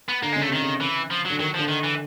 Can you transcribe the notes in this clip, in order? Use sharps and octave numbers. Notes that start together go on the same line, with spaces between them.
B3
D3 A#3
C#3 G#3
A3
C3 D#3
C#3
E3
F3
D3 F#3
D#3 F#3
D3 F3
D#3
E3